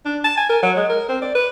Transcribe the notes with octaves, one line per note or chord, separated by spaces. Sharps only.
D4
A5
G#5
A#4
F#3
G#3
A#4
C4
D5
B4